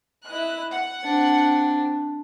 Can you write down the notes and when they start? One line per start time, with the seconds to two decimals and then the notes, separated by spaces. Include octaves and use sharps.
0.25 E4 D#5 F#6
0.72 F#5
1.04 C4 D4